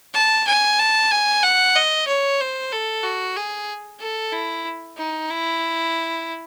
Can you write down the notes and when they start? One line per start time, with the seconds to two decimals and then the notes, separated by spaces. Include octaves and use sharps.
0.14 A5
0.47 G#5
0.79 A5
1.11 G#5
1.43 F#5
1.76 D#5
2.07 C#5
2.40 C5
2.72 A4
3.03 F#4
3.36 G#4
4.00 A4
4.32 E4
4.97 D#4
5.30 E4